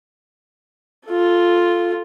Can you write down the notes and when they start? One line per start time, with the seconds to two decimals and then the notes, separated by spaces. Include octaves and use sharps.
1.08 F4 A4